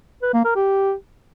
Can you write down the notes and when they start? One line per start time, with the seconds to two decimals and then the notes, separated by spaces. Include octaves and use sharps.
0.22 B4
0.34 A#3
0.45 A#4
0.56 G4